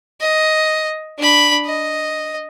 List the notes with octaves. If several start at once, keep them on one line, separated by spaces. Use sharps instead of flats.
D#5
D4 B5
D#5